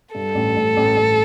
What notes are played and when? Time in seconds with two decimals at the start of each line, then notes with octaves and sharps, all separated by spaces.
0.15 G2 A4
0.35 A1
0.56 A1
0.77 A1
0.97 A1